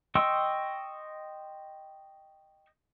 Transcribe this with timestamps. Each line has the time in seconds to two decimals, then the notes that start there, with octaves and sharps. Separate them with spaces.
0.15 D#5 G5 C6 C#6 E6